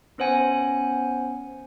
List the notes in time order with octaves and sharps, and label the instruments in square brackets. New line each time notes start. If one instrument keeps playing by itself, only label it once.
[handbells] B3 C#4 C5 F#5 G#5